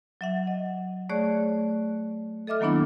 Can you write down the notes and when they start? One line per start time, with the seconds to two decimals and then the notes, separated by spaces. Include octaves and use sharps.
0.21 F#3 E5 F#5
0.47 D#5
1.09 A3 G#4 C#5 D5 C#6 F#6
2.47 A4 D#5 E5 D6 F6
2.60 D#3 F#3 A#3 B3 D4 E4